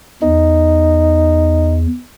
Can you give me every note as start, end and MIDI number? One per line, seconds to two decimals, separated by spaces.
0.23 1.86 40
0.23 1.77 63